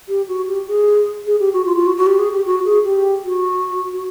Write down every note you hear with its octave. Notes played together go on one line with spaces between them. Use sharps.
G4
F#4
G4
G#4
G#4
G4
F#4
F4
F4
F#4
F#4
G4
G#4
G4
F#4
G#4
G4
F#4
F#4